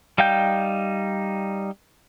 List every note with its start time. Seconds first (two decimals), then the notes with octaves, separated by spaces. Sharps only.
0.18 G3 D#4 F5 G5 G6